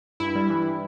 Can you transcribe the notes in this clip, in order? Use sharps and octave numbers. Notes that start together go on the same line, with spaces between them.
G2 E4
G3
E3